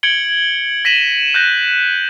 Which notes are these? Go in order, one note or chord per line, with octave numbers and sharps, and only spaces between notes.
G#6 C#7 D7 F#7 G7
A#6 B6 D#7 E7 F#7
F#6 G6 A#6